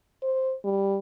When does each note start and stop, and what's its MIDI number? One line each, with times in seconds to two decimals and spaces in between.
0.23 0.54 72
0.65 0.99 55